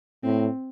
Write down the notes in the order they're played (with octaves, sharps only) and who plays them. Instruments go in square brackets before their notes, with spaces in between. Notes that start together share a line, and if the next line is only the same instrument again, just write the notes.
[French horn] A2 [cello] C4